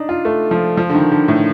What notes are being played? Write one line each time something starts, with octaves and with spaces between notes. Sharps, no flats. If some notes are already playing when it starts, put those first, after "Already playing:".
Already playing: D4 D#4
F4
A3
F3
F3
D3
D#3
D3
A2